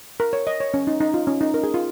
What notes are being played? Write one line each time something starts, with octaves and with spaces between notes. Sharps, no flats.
A#4
C#5
D#5
C#5
C#4
D#4
D#4
F4
C#4
D#4
A#4
G#4
F4